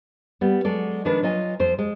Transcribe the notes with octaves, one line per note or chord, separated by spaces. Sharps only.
G3 B3
F#3 G#3 A4 D5
D#3 F3 G#3 D4 B4
F#3 F4 D#5 G#5
F2 C5
G#3